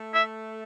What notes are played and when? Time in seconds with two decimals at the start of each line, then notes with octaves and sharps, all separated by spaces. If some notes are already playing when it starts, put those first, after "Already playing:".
Already playing: A3
0.14 E5